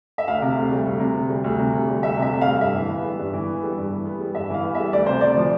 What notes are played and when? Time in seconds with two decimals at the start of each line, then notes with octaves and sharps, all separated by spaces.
0.18 E5
0.27 D2 F5
0.42 C3
0.57 D2
0.71 G3
0.86 D2
1.00 C3
1.14 D2
1.30 G3
1.44 D2
1.59 C3
1.73 D2
1.88 G3
2.03 D2 E5
2.17 C3
2.22 E5
2.31 D2
2.41 G3 F5
2.61 G2 E5
2.76 E3
2.90 B3
3.04 G3
3.19 G2
3.33 E3
3.48 B3
3.63 G3
3.77 G2
3.91 E3
4.05 B3
4.20 G3
4.35 G2 E5
4.50 E3 F5
4.64 B3
4.75 G3 E5
4.93 D2 D5
5.06 C3 C5
5.21 D2 D5
5.37 F3